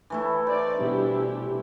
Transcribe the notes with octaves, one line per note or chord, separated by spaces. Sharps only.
E3 A3 E4
D#4 C5 D5
B2 G3 D4 E4 G4